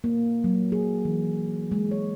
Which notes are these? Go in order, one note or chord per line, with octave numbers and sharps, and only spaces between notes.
A#3
F#3
G#4
E3
G#3
C#5